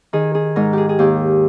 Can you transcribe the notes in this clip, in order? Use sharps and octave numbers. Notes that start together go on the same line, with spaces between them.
D#3 G#4
G#4
G#2 A#4
G4 G#4
G#4
D#2 G4